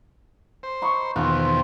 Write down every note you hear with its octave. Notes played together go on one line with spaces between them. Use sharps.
C5
D#4 B5 C#6
E2 B2 D#3 F3 C4 F#5